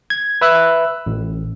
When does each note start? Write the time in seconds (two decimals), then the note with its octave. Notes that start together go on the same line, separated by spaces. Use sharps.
0.10 G#6
0.41 B4 E5 E6 F#6
1.07 A1